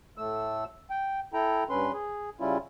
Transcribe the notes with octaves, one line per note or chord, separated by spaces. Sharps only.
A2 A3 E6
G5
E4 A4 G5 A#5
G2 C#4 B4 C6
G#4
C#3 G3 C#4 E4 F4